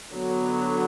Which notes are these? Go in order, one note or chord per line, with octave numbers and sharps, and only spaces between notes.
D3 F#3 B3